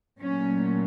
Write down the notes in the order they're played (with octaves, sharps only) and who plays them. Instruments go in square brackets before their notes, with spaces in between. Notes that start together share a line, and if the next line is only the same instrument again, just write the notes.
[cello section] A#2 F#3 A3 C#4